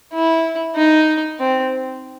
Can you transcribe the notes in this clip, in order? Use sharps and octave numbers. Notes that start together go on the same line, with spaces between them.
E4
D#4
C4